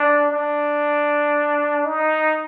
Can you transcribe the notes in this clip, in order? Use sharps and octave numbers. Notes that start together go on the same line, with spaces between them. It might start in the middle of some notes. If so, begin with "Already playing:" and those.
Already playing: D4
D4
D#4